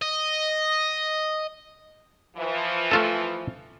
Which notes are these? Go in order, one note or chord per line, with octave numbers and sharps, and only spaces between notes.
D#5
E3 F3
A3 F4 A4